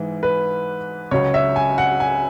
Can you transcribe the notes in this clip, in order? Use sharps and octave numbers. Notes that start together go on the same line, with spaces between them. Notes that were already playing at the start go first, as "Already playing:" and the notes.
Already playing: G#2 E3 G#3
B4
C#2 C#3 F#3 C#5
E5
G#5
F#5
G#5